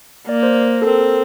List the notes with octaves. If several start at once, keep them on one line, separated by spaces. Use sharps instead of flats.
A#3 D5
C5
A4
C4 A#4
A4